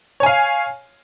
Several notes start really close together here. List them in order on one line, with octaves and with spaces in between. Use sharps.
C#5 G#5 F5